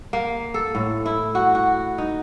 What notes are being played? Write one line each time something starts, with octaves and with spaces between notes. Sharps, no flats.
A#3
A4
A2
E4
F#4
F#4
D#4